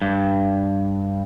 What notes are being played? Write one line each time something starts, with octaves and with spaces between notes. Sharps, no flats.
G2